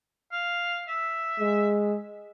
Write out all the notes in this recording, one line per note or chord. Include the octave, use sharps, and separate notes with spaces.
F5
E5
G#3